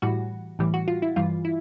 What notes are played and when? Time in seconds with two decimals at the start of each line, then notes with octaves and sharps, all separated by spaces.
0.02 A2 E3 G3 F#4
0.59 A2 E3 G3
0.74 F#4
0.88 F4
1.02 E4
1.16 G2 E3 G3 F4
1.45 E4